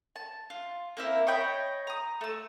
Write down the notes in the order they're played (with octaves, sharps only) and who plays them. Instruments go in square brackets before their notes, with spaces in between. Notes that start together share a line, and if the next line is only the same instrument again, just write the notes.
[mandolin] A5
F4
A#3 C4 E4 A#4
C#5 D#5 G5 B5
A#5 D#6
A3 E6